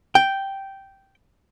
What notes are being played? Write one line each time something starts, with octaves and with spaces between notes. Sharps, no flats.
G5